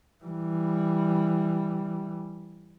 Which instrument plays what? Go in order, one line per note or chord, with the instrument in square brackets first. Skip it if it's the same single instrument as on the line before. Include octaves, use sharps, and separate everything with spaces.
[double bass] E3 G3